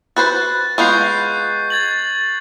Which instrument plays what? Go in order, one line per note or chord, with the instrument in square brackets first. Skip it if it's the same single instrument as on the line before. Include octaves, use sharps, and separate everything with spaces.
[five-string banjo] F#4 B4 C5 [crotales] F#6 A6
[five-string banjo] G#3 B3 F4 [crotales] C#6 G6 C7
[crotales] G#6 A6 F#7